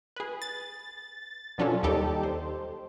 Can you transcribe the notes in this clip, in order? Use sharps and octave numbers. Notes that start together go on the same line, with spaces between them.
G#4 B4
A6
B2 F#3 C#4 D4 F4 A4
D#2 G3 D#4 G4 A4
C5